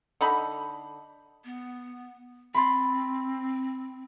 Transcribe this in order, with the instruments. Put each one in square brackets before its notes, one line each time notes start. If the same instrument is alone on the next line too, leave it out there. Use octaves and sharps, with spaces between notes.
[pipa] D3 D#4 B5
[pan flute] B3
[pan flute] C4 [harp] B5 C6 A6